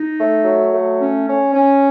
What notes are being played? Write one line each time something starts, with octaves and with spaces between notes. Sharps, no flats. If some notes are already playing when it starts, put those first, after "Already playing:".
Already playing: D#4
A3
F#3
A3
C#4
C#4
C#4